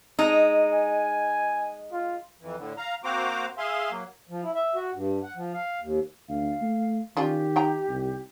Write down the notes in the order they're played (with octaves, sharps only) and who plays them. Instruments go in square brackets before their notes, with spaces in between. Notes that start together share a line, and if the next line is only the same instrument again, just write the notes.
[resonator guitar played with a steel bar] G#3 D#4
[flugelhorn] G#5
F4
[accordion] F2 E3
A2 D3
F5 A#5
A#3 C4 F#4 C5 A#5 D6
G#4 E5 F5 C6
F#3 A#3
[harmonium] F3
E4
E5
F#4
G2
F#5
F3
F5
D#2
[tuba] D2 [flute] F5
[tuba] A3
[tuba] D#3 [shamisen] C#4 F4 D5 [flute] G4
[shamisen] D#4 G5 A#5
[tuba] C2